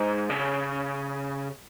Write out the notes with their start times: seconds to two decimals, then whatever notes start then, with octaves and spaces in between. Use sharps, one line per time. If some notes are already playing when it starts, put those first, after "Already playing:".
Already playing: G#2
0.30 C#3